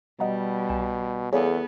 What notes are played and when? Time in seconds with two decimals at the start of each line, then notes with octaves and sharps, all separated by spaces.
0.20 B2 G3 D#5 F#5 A#5
0.69 C2 G#5 E7
1.33 E2 B3 G#4 A4 C#5 D5 F5